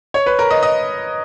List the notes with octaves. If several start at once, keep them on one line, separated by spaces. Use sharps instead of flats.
C#5
B4
A#4
D#5
D#5